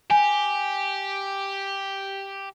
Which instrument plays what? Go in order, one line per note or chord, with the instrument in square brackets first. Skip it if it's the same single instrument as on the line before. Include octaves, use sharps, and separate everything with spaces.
[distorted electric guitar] G4 [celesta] G#5